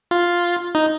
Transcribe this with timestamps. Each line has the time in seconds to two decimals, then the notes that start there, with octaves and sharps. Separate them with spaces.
0.11 F4
0.75 D#4